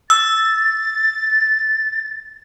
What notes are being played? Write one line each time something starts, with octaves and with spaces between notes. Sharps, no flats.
E6 A6